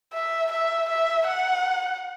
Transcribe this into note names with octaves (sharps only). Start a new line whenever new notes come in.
E5
E5
E5
F#5